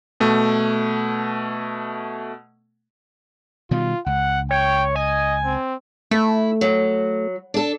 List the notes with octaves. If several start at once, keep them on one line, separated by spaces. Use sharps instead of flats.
B2 A3
B2 D#3 G3 F4
C#2 F#5
C#5 G5
D#5 G#5
C4
A3 E4
F#3
D4 A4